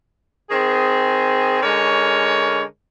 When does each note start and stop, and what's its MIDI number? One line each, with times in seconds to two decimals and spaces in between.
0.49 1.61 51
0.49 1.61 60
0.49 1.61 68
1.62 2.63 50
1.62 2.63 56
1.62 2.63 61
1.62 2.63 70
1.62 2.63 73